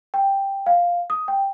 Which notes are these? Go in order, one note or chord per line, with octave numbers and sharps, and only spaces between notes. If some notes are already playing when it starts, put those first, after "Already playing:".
G5
F5
D#6
G5